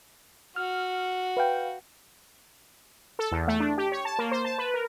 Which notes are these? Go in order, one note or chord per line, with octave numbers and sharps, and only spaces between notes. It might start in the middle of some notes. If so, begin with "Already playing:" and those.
F#4 F6
B4 F5 G5
A4
E2
A3
D4
G4
C#5
A5
A#3
C5
A5
B4
A#4